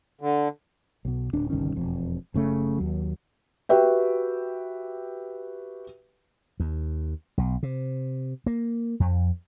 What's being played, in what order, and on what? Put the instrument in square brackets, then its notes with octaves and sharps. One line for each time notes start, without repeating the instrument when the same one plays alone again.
[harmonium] D3
[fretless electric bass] B1 B2
D1 D4
G1 C2 D#3 C#4
E1 F2
F#1 C#3 A3
D#2 F#3
[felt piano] F#4 G4 B4 E5 G5
[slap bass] D#2
B1
C3
A#3
F2